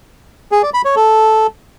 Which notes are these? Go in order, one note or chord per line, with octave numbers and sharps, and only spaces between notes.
G#4
D5
B5
C#5
A4